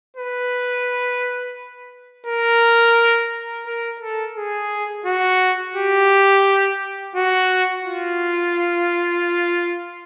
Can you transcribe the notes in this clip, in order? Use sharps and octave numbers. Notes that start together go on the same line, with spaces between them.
B4
A#4
A#4
A4
G#4
F#4
G4
F#4
F4